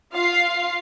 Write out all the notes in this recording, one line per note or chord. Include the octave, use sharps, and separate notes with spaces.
F4 F5 C7